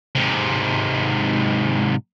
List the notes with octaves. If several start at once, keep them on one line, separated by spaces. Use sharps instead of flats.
G#2 C3